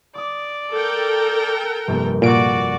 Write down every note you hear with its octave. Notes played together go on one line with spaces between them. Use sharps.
D5 D6 D#6
A4 A#4 G5
F1 G2 A#3
A#2 F#4 D5 D7